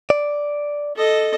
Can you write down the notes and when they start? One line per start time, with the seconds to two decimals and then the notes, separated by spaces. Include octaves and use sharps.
0.10 D5
0.96 A4 D#5